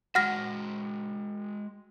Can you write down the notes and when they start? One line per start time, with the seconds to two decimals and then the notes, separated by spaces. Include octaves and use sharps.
0.15 G#3 F#4 F#5 F6 A#6